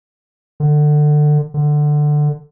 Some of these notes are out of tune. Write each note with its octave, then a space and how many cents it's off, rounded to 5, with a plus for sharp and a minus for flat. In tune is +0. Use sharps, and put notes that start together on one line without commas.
D3 +25
D3 +15